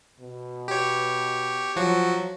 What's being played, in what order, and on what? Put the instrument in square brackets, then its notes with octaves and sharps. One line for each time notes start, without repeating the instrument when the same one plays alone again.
[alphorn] B2
[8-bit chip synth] G4 C#5
[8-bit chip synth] F3 F#4 [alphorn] F#3